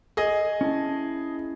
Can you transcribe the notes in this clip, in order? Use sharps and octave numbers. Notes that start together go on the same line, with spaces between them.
G#4 D#5
C#4 E4 A5